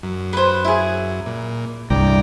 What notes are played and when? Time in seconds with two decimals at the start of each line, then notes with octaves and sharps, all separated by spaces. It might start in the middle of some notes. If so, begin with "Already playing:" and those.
0.03 F#2
0.33 B4 C5
0.65 E4 G#4
1.26 A#2
1.90 C2 G2 D5 G5 A#5